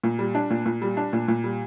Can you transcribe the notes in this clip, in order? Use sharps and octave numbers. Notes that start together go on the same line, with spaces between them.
A#2
G3
D4
A#2
A#2
G3
D4
A#2
A#2
G3